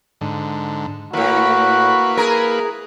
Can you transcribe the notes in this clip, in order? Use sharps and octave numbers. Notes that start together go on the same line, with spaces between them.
G#2 D3
D#2 A2 A#3 E4 F#4 B4
G#4 A#4